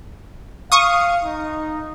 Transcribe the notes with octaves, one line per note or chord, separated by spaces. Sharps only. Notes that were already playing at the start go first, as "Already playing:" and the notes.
F5 C#6 D#6
D#4